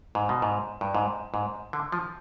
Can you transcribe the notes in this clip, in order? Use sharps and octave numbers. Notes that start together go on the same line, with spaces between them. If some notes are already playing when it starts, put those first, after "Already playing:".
G#2
B2
G#2
G2
G#2
G#2
D3
F3